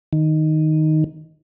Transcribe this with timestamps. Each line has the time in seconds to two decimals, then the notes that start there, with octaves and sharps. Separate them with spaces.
0.13 D#3